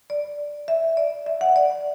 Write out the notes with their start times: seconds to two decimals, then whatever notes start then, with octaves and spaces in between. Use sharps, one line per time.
0.10 D5
0.68 E5
0.97 D5
1.26 E5
1.41 F#5
1.56 D5